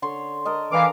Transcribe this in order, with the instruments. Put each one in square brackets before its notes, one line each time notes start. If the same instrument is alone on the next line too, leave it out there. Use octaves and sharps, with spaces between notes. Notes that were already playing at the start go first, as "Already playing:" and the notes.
[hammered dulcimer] D3 C#5 C6
A4 A#4 D#5
[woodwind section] E3 F5 D6 [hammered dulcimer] D4 A#5